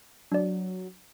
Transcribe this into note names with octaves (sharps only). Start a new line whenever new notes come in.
F#3 D4 D5